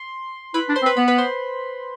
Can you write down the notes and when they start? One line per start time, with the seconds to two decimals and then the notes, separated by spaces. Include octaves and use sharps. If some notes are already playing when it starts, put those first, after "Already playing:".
Already playing: C6
0.54 E4 B4 B5
0.69 D4
0.76 C5 C6
0.83 C4
0.86 B4 B5
0.97 B3 B4 B5
1.08 B4 B5
1.18 C5 C6